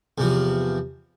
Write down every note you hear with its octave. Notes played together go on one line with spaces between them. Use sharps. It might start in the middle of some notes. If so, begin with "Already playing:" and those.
E2 C3 F3